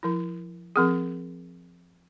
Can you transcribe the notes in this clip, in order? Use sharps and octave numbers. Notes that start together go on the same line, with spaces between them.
F3 E4
F3 C4 G#4